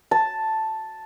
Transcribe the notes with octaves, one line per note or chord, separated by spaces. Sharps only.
A5